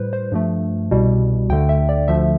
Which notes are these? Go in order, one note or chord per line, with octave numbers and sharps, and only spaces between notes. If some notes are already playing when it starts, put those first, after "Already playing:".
Already playing: A2 G3 B4 C5
C5
G2 F3 A3
C2 B2 G3
D2 D3 A3 G5
E5
D5
D2 D3 F3 A3 E5